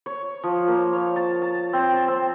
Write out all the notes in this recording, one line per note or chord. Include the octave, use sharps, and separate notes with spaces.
C#5
F3
A#3
C#5
A5
A5
C4
A5
C4